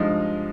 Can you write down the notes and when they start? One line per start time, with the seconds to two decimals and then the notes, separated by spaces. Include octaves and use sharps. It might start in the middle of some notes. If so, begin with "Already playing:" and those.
Already playing: G2 F3 G#3 D#4